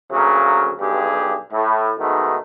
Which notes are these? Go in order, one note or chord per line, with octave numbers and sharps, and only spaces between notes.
D2 C#3 F#3 A#3
B1 G2 G4 G#4
A2
G#2 B2 D#3 A3